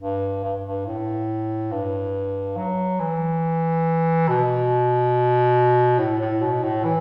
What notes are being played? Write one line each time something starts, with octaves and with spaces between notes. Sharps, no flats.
G2
G2
G2
A2
G2
F#3
E3
B2
A2
A2
B2
A2
E3